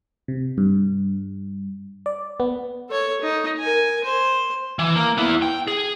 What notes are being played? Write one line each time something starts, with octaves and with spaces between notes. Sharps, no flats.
C3
G2
D5
B3
A4 C#5
D#4
A#4 G#5
C5
E3
A#3
B3 E4
G5
G#4